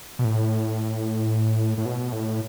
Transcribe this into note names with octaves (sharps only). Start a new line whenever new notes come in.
B2
A2
A2
B2
A2